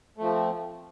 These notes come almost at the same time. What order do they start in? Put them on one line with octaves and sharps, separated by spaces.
A3 F3 C4